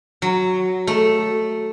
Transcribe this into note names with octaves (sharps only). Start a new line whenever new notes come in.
F#3
A3